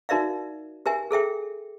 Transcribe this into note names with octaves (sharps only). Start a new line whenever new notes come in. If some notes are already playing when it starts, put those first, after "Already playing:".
D#4 F#4 A#4 D5 E5 F5
G4 A#4 E5 G#5
G#4 A4 E5 G5